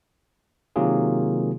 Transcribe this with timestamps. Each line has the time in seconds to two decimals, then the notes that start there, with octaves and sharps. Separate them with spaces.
0.76 C3 D#3 F#3 A#3 F4 G#4